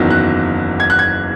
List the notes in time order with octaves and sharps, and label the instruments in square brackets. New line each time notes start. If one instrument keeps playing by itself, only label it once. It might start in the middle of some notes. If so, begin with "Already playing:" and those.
Already playing: [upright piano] F#1 E2 D#3 F#3
F#6
G#6
F#6
G#6